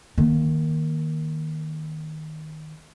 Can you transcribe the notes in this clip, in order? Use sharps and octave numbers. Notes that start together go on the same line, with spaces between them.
D#3 A#3